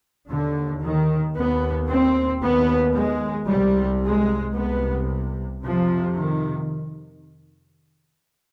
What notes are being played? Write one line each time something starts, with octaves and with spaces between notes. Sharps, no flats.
D#2 D3
D#3
D#2 B3
C4
D#2 B3
G#3
C2 C3 G3
G#3
C2 C3 B3
F2 C3 F3
D#3